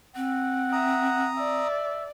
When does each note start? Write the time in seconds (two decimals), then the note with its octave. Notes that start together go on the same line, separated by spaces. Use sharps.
0.16 C4 F#5
0.72 E5 A#5 D#6
1.37 D5 E5